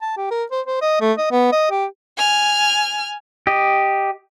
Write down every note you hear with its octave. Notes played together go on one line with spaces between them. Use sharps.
A5
G4
A#4
C5
C5
D#5
A3
D#5
B3
D#5
G4
G#5 F6
G4 D#5